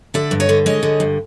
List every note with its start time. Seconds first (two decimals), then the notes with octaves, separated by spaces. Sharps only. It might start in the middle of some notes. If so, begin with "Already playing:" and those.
0.14 D3 D5 E5
0.31 G2
0.40 C#5 D#5
0.49 D3
0.66 G#3 C#5 D#5
0.83 D3
1.00 G2